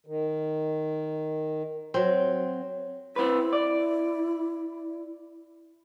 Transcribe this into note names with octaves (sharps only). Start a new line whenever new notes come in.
D#3
F#3 C4
C4 E4 B4
D5